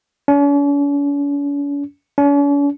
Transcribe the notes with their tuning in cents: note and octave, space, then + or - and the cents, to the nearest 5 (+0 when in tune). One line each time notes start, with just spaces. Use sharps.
C#4 +45
C#4 +45